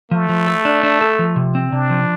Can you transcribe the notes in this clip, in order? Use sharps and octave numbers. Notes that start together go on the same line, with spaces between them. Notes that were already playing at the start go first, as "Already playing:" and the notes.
F3 A3
F3
A4
D4
D4
A4
F3
C3
C4
C3 D4
F3